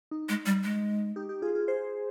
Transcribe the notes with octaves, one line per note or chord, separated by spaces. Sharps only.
D#4
G#3
G3
G#3
D#4 G4
D#4 G4
F4 G#4
F4 G#4
G#4 C5